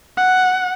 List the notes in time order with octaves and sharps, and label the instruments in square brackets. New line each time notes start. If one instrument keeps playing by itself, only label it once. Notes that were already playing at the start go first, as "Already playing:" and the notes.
[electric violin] F#5